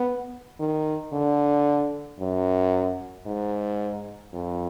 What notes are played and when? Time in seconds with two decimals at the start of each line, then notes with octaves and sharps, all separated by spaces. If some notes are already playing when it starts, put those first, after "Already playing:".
Already playing: B3
0.59 D#3
1.13 D3
2.20 F#2
3.26 G#2
4.34 F2